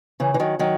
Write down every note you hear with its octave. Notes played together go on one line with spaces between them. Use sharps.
C#3 E3
E3
D#3 F#3
D#3 F#3